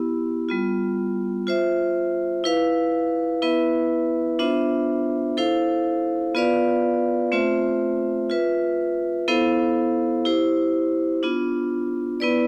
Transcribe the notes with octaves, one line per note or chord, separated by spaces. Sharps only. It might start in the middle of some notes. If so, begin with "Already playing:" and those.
Already playing: B3 E4 G4
G3 B3 F4
F4 C5 E5
E4 B4 F5
B3 E4 B4 E5
B3 D4 F4 C5 E5
E4 A4 C5 F5
B3 F4 B4 D5 F5
A3 C4 F4 C5 E5
F4 B4 E5
B3 E4 A4 C5 F5
E4 G4 C5
B3 D4 F4
B3 E4 B4 D5